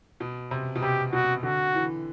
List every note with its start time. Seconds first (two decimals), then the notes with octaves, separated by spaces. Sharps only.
0.20 B2
0.51 C3
0.75 B2
0.82 C3 G4
1.13 B2 F#4
1.43 D3 F#4
1.75 E3